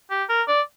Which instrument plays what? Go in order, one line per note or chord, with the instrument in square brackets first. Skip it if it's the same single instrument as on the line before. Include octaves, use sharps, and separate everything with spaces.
[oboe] G4
A#4
D5